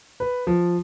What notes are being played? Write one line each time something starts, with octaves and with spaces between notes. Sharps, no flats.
B4
F3